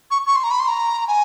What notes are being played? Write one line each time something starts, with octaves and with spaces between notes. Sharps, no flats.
C#6
C#6
C6
A#5
B5
C6
A#5
G#5